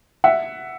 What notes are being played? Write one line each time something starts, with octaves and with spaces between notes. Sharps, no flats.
E5 F#5